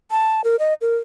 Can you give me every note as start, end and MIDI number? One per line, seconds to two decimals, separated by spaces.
0.11 0.41 81
0.44 0.56 70
0.59 0.74 75
0.81 0.96 70